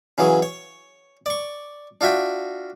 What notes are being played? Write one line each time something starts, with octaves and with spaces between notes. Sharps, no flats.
C#3 E3 F#3 G#4
C#5
D5 C#6
D4 F4 F#4 E5 G5